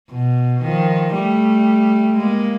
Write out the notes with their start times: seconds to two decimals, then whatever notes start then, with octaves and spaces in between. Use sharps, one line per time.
0.11 B2
0.62 D#3 F3
1.13 G3 A3
2.17 G#3 A#3